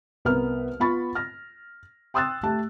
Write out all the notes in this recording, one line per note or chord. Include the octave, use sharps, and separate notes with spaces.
C2 B3 A#4 B4 F6
B3 F4 B5 C#6 A6
F6 A#6
G5 C6 D#6 E6 F#6 A6
A3 G4 A5